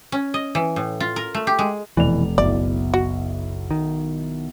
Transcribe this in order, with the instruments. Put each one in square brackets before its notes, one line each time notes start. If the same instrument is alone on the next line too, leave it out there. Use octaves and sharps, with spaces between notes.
[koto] C#4
D#5
E3
A2
F4
A#4
A3
G4
G#3
[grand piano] F1 D5 F7 [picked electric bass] B2 E3
[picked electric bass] F#1 [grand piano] B1 B2 E4 [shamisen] D5
[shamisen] F#4
[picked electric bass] D#3